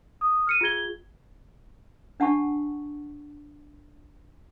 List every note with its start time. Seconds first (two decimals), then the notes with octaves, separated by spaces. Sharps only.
0.21 D#6
0.47 F6 C#7 D#7
0.61 F4 G#4 G#6 G7
2.20 D4 F#5 A5 C#6